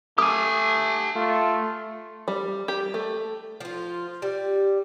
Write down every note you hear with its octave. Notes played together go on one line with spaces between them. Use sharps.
A3 G4 G#5 D6 D#6
A3 F4
G3
G4
A3
F3 F4
G3